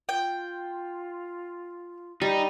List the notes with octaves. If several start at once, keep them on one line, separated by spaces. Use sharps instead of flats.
F4 G5
G3 D#4